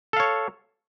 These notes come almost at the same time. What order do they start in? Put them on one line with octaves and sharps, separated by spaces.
A4 F5 C#5